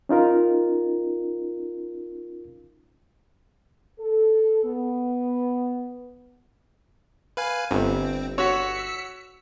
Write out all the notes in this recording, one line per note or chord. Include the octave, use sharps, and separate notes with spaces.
C#4 D#4 F4 A#4
A4
B3
B4 F5 G#5
G1 C4
F#4 C#5 E6 B6 C#7